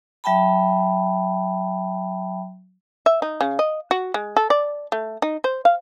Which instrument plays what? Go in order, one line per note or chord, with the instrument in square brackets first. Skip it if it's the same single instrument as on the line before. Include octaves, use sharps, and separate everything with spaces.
[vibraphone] F#3 E5 G5 A5 B5
[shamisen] E5
D#4
C#3
D#5
F#4
G#3
A4
D5
A3
D#4
C5
F5